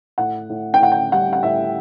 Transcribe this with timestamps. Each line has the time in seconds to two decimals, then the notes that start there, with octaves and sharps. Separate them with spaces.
0.18 A2 F#5
0.50 A2
0.74 G5
0.80 A2 F#5
0.92 G5
1.12 G3 F#5
1.33 F#5
1.43 A2 E5